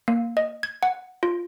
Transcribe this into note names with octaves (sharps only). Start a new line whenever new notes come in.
A#3
D#5
G#6
F#5
F4